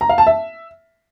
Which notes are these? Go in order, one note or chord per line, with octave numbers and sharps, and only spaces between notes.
A#5
F5
A5
E5